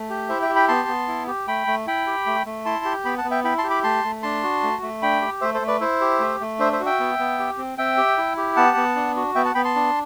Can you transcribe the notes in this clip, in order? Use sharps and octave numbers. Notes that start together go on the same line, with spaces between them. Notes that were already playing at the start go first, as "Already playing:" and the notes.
Already playing: A3
G4
E4 C5 E5
E5 G5
G4
G5 B5
B3 A5 C6
B3
E4
G4
A3 G5 B5
A3
E4 G5 B5
G4
A3
A3
E4 A5 C6
G4
B3 G5 B5
F#5 A5
B3
E5 G5
E4 G5 B5
A5 C6
G4
B5 D6
A3 A5 C6
A3
D4 A5 C6
F#4
A3
A3
D4 G5 B5
G4
A3 C5 E5
A4 C5
A3
B4 D5
E4 C5 E5
G4
A3
A3
D4 C5 E5
C5 E5
F#4
E5 G5
B3
B3
G4
C4
C4 E5 G5
G4
E4
G4
B3 F#5 A5
B3
D4
F#4
B3 E5 G5
F#5 A5
B3 G5 B5
A5 C6
D4